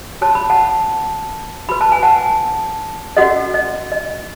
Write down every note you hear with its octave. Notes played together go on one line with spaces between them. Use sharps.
F#4 C#5 A5
B5
F#5 A5
F#4 B4 B5
A5
G#5
F#5 A5
C#4 F#4 A4 D#5 F#5
D#5
D#5